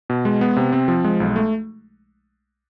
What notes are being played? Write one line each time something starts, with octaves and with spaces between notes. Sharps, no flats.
B2
G#3
B3
C3
C4
F3
G#3
B1
A3